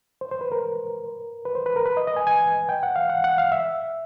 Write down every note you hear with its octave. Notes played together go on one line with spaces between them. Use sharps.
C5
C5
B4
A#4
B4
C5
B4
A#4
B4
D#5
D#5
G#5
G#5
G5
F#5
F5
F#5
F#5
F5
E5